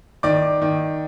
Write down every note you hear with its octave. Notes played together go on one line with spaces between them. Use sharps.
D#3 D5 D6
D#3